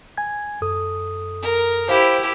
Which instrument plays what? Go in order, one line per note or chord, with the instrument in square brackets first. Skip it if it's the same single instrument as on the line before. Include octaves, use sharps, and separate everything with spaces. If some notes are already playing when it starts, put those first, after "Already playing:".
[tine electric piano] G#5 G#6
F#2 A4 D#6
[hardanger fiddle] A#4
[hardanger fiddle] E4 G4 [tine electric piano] C5 F5